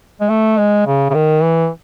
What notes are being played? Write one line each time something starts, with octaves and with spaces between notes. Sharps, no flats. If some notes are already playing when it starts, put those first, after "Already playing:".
G#3
A3
G#3
C#3
C#3
D#3
E3